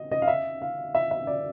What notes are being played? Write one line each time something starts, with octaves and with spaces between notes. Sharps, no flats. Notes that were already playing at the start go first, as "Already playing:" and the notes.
Already playing: D#5
D#5
F5
E5
F5
E5
E5
D5